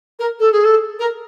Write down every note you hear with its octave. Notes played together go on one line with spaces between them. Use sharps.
A#4
A4
G#4
A4
A#4